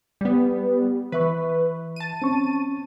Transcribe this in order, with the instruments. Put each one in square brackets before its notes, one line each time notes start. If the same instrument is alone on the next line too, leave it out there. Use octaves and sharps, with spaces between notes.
[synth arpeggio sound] G3 B3
[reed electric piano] E3 E5 C#6 [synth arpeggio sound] B4
[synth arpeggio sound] A5 D#7
[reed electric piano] C4 C#4 C#6